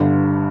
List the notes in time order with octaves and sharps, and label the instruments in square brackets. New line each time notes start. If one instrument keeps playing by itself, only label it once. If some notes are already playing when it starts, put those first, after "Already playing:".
Already playing: [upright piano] G1 G2 D3